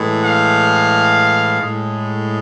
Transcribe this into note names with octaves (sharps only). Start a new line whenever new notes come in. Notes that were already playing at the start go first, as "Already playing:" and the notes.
Already playing: A2 E3 G#3
F5
A2 G#3